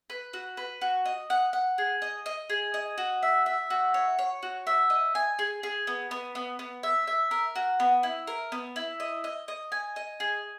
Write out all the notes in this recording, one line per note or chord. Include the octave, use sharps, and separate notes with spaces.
B4
F#4
B4
F#4
D#5
F#5
F#5
G#4
D#5
D#5
G#4
D#5
F#4
E5
E5
F#4
C#5
C#5
F#4
E5
D#5
G#5
G#4
G#4
B3
B3
B3
B3
E5
E5
A#4
F#4
B3
E4
A#4
B3
E4
D#5
D#5
D#5
G#5
D#5
G#4